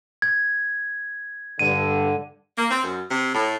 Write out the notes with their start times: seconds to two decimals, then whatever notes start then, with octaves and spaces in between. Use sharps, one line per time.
0.22 G#6
1.59 G2 D3 D#7
2.56 A#3
2.70 C4
2.84 F#2
3.10 C3
3.33 A2